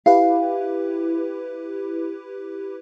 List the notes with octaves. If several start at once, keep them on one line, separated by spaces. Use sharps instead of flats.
E4 G4 B4 F5